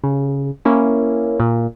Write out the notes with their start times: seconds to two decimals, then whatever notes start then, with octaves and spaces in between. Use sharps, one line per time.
0.04 C#3
0.65 A#3 C#4 E4
1.40 A#2